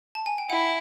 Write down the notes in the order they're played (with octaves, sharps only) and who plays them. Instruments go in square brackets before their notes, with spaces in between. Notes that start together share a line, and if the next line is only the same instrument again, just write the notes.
[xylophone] A5
G#5
G5
[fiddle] E4 [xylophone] F#5